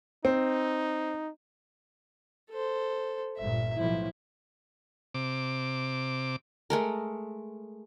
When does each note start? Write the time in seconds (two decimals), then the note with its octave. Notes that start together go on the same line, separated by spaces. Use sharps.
0.25 C4 D#4
2.51 A4 C5
3.38 G1 A#2 E5
3.77 B1 A2 F3 E4
5.14 C3 D6
6.70 G#3 A3 A#4